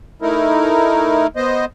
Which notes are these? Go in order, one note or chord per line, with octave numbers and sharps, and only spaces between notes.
A3 D#4 E4 A#4
B3 C5 D#5